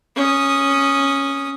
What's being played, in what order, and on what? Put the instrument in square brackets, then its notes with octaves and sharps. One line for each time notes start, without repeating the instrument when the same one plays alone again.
[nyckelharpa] C#4 D#6